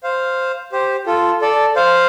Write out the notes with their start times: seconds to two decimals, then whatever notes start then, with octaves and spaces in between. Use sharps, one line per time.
0.03 C5 F5
0.72 G4 C5
1.06 F4 A4
1.41 A4 D5
1.76 C5 F5